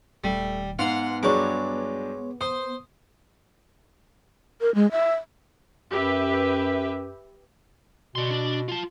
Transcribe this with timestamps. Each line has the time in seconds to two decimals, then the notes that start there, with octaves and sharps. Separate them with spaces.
0.24 D#1 G3 A3
0.79 G#2 B3 F5 F#5 C6
1.23 G2 F#3 G#3 D4 C#5 D6
2.41 C5 D#6
4.61 A#4
4.75 G#3
4.91 E5
5.90 F#2 G4 B4 E5
8.15 B2 D5 C6
8.31 D4 D5
8.68 F4 A5